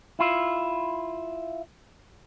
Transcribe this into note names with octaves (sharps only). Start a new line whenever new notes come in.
E4 F4